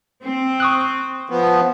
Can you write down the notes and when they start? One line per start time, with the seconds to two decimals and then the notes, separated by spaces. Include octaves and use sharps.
0.23 C4
0.60 C#6 D#6 F#6
1.30 F3 B3